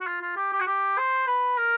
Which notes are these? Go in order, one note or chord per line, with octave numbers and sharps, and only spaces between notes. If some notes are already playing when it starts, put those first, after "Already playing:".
F#4
F4
F4
G4
G4
F#4
G4
C5
B4
A#4